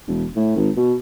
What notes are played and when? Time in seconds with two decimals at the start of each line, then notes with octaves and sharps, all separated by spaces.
0.07 E1
0.36 A2
0.56 G#1
0.77 B2